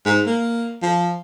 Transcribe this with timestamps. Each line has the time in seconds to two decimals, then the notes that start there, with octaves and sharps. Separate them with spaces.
0.06 G#2
0.27 A#3
0.82 F3